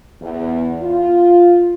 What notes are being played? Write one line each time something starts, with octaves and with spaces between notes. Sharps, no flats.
E2
F4